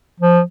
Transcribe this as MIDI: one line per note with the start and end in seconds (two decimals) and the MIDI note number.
0.20 0.41 53